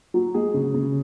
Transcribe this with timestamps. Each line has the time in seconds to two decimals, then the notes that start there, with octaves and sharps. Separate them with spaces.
0.14 F#3
0.34 G#3 G#4
0.54 C#3
0.74 C#3